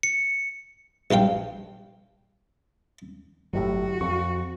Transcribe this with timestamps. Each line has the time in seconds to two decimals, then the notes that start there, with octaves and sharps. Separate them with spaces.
0.03 C#7
1.11 A#1 G2 F5 G5
3.53 G1 A2 F#3 F#4 G4
4.01 F2 C#6